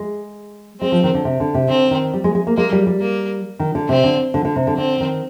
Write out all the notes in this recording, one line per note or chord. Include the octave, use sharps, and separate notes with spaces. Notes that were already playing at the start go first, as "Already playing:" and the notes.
Already playing: G#3
G#3 C4
F3
D#3
D3
C3
D3
C3
D3 C4
D#3
G3
G#3
G#3
A#3
G#3 A#3
G3
G3
A#3
D#3
D3
C3 C4
D3
D3
D3
C3
D3
D3 C4
D#3